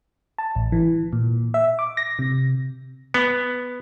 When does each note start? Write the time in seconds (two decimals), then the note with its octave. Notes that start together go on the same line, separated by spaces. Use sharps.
0.38 A5
0.55 A1
0.72 E3
1.13 A#2
1.54 E5
1.79 D6
1.97 A#6
2.19 C3
3.14 B3